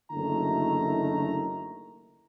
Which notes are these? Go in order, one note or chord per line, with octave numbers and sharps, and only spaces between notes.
F#1 D3 D#3 A3 E4 A#5